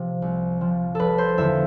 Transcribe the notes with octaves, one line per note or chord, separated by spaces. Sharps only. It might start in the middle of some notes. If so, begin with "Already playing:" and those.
Already playing: C3 F3
C2
C3 F3
F1 A4 B4
C5
E2 D3 F3 E5